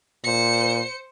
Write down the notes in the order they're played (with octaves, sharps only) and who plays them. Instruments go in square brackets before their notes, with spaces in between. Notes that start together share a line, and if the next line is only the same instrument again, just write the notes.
[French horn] A#2 [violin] C5 C#7